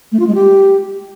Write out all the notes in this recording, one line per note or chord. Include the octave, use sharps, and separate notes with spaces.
A3
F4
G#3
G4